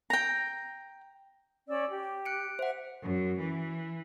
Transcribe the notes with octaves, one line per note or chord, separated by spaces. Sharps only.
G5 A#5
C#4 D5 E6
G4
F#6 C#7 D7
C5 E5 F#5 F#6
F#2
E3